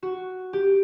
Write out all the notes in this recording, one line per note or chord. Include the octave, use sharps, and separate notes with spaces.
F#4
G4